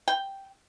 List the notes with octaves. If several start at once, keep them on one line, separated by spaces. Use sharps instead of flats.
G5